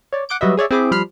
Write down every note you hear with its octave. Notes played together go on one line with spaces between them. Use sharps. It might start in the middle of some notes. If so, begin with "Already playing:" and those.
C#5 D5
F#5 D6 G6 D7
F#3 G3 F#4 B4 D#5 E5
G#4 C#5 D5 E5
C4 E4 G#4 B5 D6
F3 G3 B5 F6 C7